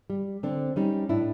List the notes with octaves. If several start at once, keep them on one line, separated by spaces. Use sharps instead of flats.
G3
D3 C4 D4
G3 C#4 D#4
A2 D4 E4